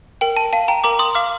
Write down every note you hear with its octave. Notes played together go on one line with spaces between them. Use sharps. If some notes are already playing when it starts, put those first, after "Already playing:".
A#4 G5
A5
F5 A5
G5 A#5
A#4 A#5 D6
C6 D#6
F5 D6 F6